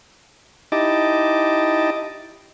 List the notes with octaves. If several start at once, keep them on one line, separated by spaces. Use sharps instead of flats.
D#4 E4 G4 D#5 A5 D6